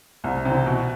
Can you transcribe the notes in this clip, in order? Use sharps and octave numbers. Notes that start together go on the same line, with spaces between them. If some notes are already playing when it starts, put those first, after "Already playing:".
C2
C3 E3
B2